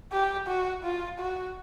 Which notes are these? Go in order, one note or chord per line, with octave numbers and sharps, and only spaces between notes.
G4
F#4
F4
F#4